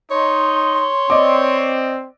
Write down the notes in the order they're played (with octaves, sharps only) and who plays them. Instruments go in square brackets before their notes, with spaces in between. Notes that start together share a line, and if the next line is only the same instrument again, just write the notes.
[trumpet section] D#4 [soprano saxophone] C#5 [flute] C6
[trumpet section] C4 [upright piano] D5 D#5 D6